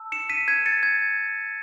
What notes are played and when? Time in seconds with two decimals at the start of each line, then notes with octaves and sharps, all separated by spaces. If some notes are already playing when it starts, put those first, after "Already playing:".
Already playing: A5 E6
0.12 C#7 E7
0.30 B6 D#7
0.48 G#6 B6
0.66 A6 C#7
0.83 G#6